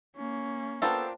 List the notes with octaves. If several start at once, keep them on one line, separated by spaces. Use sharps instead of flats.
A#3 C#4
B3 D4 F4 A4 A#4 C5 G5 A5